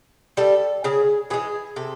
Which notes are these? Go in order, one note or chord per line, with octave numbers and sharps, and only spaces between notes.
G3 A4
C#3 G#4
E3 G#3 G#4
C3 A4